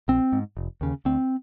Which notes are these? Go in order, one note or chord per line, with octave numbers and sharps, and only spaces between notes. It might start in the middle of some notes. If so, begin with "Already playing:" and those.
A#1 C4
G#2
F1
D#2 C#3
D2 C4